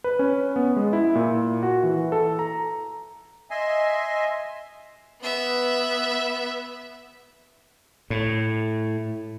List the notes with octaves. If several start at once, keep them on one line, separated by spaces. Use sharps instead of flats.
B4
C#4
B3
G#3
E4
A#2
F#4
E3
A4
A#5
D#5 E5 G#5 C6
B3 E5
A2